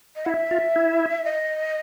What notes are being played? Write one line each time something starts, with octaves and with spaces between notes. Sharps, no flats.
D#5
E4 F#5
E5
F4
E4
D#5